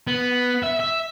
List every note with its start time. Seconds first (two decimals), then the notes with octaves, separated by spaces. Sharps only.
0.07 B3
0.64 E5
0.80 E5